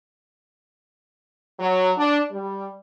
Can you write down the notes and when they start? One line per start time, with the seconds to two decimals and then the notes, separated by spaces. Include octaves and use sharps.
1.59 F#3
1.97 D4
2.31 G3